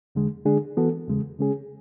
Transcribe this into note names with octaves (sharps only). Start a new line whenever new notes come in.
E2 D3 G#3
D3 G#3 D4 G#4
E3 B3 F#4 A4
E2 C#3 G#3
C#3 G#3 C#4 G#4